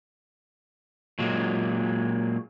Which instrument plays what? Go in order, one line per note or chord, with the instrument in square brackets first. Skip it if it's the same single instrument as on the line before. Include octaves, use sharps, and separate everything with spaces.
[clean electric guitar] A#2 F#3 G#3 A#3